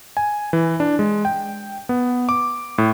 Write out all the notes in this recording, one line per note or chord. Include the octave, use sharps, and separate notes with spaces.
G#5
E3
D4
G#3
G5
B3
D6
A2